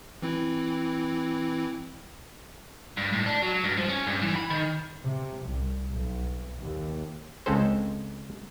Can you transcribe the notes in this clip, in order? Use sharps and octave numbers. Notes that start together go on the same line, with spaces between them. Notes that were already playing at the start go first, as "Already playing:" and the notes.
E3 C4 E4
G2
A2
D4
F#3
G2
F3
C#4
G2
E3
B5
D#3
C3
C2
B1
D#2
C#2 G#3 C4 C#4 A4 C5